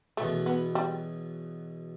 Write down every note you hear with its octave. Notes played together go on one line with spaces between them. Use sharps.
E2 B2 F#3 A3
B3
G3